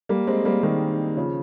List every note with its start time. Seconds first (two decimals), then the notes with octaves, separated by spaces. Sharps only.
0.09 G3 A#3
0.27 G#3 C4
0.45 G3 A#3
0.63 D#3 G3
1.17 C#3 F3